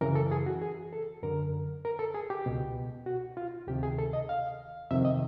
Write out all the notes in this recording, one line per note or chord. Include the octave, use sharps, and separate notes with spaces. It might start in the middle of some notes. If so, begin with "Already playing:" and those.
F#2 C#3 E3 A#4
A4
G#4
F#4
G#4
A4
F#2 D3 A#4
A#4
A4
G#4
G4
C#2 B2
F#4
F4
D2 C3 D#3 G4
G#4
A4
D#5
F5
F2 C3 D#3 E5
D#5